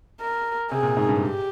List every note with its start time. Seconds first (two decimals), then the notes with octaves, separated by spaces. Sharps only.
0.21 A#4
0.71 C3 G#4
0.83 A#2
0.97 G#2
1.09 G2
1.21 G4